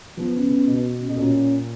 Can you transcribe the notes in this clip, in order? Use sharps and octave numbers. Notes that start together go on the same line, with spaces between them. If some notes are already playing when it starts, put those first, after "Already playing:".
F3 B3
C#3
C#3
B2
C#3
B2
A#2 C#4